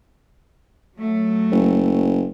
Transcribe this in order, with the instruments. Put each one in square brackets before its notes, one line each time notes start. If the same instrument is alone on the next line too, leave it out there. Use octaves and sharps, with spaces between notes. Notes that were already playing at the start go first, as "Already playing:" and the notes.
[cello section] F#3 A3
[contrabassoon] F#1